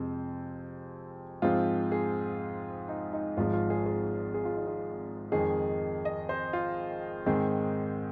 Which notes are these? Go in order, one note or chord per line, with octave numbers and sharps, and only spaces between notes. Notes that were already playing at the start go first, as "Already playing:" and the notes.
Already playing: F2 C3 G#3 C4 C5
G#2 F3 G#3 C4 F4
G#4
D#4
D#4
G#1 G#2 F3 G#3 F4
F4
G#4
G#4
G#4
F4
D#4
F4
F2 D#3 G#3 G#4
D#5
C5
F4
G#2 D#3 C4 G#4